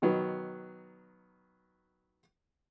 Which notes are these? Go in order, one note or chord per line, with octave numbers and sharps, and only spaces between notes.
B2 D#3 F#3 B3